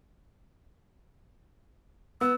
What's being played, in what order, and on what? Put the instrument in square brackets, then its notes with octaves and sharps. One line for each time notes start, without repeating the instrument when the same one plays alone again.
[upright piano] B3 [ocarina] E6